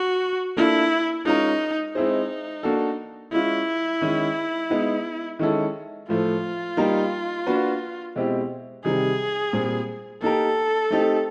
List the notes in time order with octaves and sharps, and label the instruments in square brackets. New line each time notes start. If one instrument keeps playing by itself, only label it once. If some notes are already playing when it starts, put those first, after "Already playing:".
Already playing: [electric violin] F#4
[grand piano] A#3 D4 F4 A4 [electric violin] E4
[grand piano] G#3 C#4 F4 A#4 [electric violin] D#4
[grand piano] G#3 C4 E4 G#4 C5 [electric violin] D#4
[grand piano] A#3 D4 F#4 A4
[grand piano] G#3 C#4 F4 [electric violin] E4
[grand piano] D#3 G#3 C#4
G#3 B3 D#4
D#3 G#3 C#4 E4 A4
[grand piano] A2 F3 A3 [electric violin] F4
[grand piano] G3 A#3 D#4 G4 A#4
A#3 D4 F#4 B4
B2 G#3 C4 E4 G4
[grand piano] C3 D#3 G3 [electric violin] G#4
[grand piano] A#2 G3 C4
[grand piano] A#3 D#4 G4 A#4 [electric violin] A4
[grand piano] A3 C4 D#4 G4